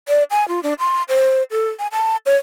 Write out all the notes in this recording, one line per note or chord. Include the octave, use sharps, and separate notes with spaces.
D5
G#5
F4
D4
C6
C5
A4
G#5
A5
C#5